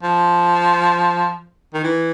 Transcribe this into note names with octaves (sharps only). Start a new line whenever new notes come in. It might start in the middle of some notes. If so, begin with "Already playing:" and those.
F3
D#3
E3